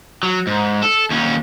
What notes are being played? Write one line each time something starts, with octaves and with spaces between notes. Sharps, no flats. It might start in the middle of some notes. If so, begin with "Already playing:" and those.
F#3
G#2
A4
D#2 C#4